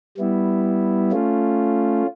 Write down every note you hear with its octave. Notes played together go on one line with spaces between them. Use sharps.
G3 B3 E4
A3 C#4 F4